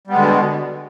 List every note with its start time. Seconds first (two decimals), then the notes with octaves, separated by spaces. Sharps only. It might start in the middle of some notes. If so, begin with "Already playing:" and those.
0.07 G3
0.10 B3
0.13 G#3
0.16 D3
0.19 B2